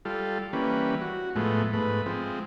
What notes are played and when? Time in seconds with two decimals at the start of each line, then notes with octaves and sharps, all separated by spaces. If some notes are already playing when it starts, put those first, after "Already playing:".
0.05 G3 F4 A4
0.53 E3 G3 A#3 C#4 B4
1.01 F#4
1.36 A2 F3 G#3 A3 B3
1.73 G#2 A3 B4
2.06 F3 G#3 C4